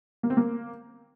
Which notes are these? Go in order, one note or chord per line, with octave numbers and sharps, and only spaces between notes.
A#3
C4
A#3